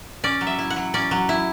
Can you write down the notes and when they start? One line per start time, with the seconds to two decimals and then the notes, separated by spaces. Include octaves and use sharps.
0.24 C#4 D5
0.41 F#3
0.47 E5
0.59 E4
0.70 F#5
0.76 F#3
0.94 C#4 D5
1.11 F#3
1.29 E4